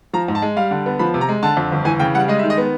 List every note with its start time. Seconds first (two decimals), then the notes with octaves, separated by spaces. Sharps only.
0.13 F3 A#5
0.28 G#2
0.35 A5
0.42 G#3
0.56 G3 F5
0.71 D3
0.86 B3
0.99 F3 B5
1.14 C3
1.21 A#5
1.29 G#3
1.43 D3 A5
1.57 F2
1.72 G1
1.85 E3 G#5
1.99 C#3 G5
2.14 G3 F#5
2.28 G#3 D#5
2.39 E5
2.43 D#3
2.50 D#5
2.58 B3